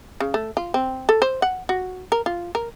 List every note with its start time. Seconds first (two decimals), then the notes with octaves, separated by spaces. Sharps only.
0.20 C#3
0.34 A3
0.57 F4
0.74 C4
1.09 A4
1.22 C5
1.42 F#5
1.69 F#4
2.12 A#4
2.26 F4
2.55 A#4